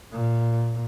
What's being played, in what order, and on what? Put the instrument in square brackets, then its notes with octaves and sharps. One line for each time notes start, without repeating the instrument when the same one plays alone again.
[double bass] A#2